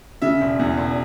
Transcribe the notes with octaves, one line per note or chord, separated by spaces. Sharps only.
C#3 E5
E1
E2
E1